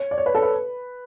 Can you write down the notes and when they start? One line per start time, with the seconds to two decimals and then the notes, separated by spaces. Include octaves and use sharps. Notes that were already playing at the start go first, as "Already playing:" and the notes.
Already playing: C#5
0.11 D5
0.18 C#5
0.26 B4
0.35 A4
0.42 B4